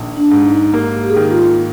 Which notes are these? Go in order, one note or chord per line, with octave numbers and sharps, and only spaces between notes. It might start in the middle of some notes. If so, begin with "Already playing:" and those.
Already playing: A#1 D#3 A#3
D4
G#2
D#4
A#3 G4
G4
G#4
D#3 G4
F4